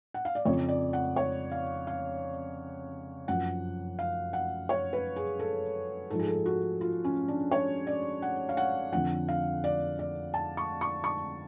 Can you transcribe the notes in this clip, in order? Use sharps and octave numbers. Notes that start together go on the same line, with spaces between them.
F#5
F5
D5
F2 C#3 F3 C#5
D5
F#5
C#5
F5
F5
F#2 F3 F#5
F5
F#5
C#5
B4
G#4
A4
G#2 F3 A4
G#4
A4
F#4
F4
C#4
D4
C#5
D5
F#5
F5
F#5
F2 D3 F3 F#5
F5
D5
D5
A5
C#6
C#6
C#6